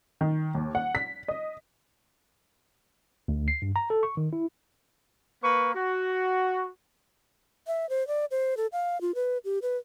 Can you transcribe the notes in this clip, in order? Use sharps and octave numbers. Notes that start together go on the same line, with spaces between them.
D#3
D#2
F#5
B6
D#5
D2
C7
G2
A#5
A4
C#6
D#3
E4
A#3 B4 C#6
F#4
E5
C5
D5
C5
A4
F5
F4
B4
G4
B4